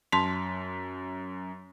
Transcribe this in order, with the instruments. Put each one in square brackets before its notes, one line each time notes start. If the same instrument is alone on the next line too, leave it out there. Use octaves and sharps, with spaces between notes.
[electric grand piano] F#2 B6 [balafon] A5 C6